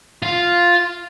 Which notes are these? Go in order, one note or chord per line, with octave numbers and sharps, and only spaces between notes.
F4